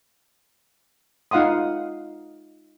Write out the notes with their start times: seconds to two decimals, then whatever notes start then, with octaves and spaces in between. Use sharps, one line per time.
1.31 D#4 F4 F5 F#5 C6 D#6